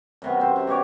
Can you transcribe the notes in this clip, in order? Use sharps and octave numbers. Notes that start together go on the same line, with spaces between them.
F#2 C3 B3
C4 C5
C3
B2 G4 C#5 D6